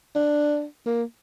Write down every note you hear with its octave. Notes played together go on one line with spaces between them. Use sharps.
D4
A#3